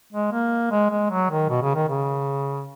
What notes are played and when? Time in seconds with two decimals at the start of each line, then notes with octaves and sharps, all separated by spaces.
0.12 G#3
0.32 A#3
0.71 G#3
0.90 G#3
1.10 F#3
1.30 D#3
1.49 B2
1.62 C#3
1.75 D#3
1.88 C#3